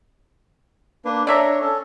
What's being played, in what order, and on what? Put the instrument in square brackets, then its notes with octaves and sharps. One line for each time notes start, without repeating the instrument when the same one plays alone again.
[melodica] A#3 D4 B4
[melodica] D4 C#5 [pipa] D5 E5 A#5
[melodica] C#4 A4